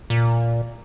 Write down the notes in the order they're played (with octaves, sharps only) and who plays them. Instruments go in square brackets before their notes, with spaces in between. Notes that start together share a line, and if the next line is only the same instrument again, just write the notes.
[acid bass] A#2